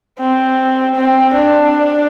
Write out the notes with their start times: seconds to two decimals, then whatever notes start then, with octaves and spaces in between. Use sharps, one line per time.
0.20 C4
0.96 C4
1.34 D4